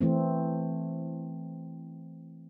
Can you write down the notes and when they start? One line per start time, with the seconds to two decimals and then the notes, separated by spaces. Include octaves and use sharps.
0.01 E3 A3 C4